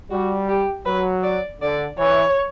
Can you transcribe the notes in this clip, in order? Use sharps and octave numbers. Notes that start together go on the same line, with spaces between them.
G3 F#4
G4
F#3 B4
D5
D3 D5
E3 C#5